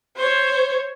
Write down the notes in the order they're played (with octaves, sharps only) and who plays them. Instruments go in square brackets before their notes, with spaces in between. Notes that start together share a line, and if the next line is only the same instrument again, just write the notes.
[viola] C5 C#5